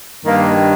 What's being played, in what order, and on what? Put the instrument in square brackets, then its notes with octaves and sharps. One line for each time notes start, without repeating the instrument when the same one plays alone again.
[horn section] G2 D#3 A#3